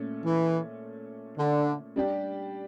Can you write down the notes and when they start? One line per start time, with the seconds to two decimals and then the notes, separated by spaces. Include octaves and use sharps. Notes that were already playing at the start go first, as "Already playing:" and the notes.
Already playing: A#2 A3 C#4
0.24 E3
1.38 D3
1.96 G3 D4 G4